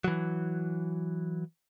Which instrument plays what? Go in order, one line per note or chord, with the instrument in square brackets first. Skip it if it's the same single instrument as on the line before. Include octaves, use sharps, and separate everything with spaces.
[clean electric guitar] E3 F#3